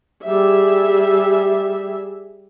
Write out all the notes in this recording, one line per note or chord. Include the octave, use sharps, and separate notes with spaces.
G3 G#4 E5